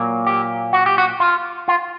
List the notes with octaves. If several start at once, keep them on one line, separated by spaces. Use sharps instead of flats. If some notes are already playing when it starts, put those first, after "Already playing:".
Already playing: A#2 F#3 A#3
G4
F#4
G4
F#4
F4
F4